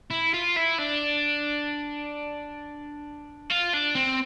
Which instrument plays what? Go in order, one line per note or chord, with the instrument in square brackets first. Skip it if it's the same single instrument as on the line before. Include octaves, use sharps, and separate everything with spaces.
[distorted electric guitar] E4
F4
E4
D4
F4
D4
C4